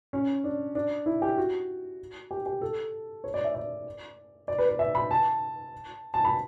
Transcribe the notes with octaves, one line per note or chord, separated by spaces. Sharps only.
C#4
D4
D4
E4
G4
F#4
G4
G4
A4
C#5
D5
E5
D5
D5
B4
B4
E5
B5
A5
A5
B5